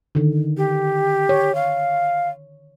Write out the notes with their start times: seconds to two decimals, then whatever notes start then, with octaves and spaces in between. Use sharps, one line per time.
0.15 D3 D#3
0.57 G4
1.29 C#5
1.55 F5